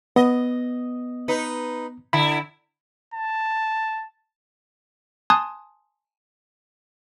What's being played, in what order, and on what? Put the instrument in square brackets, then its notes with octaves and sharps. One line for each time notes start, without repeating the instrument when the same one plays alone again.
[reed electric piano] B3 [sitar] D#5
[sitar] D#4 B4
[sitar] D3 E4 [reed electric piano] B5
[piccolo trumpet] A5
[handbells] G#5 A5 C6 D#6 F#6 G#6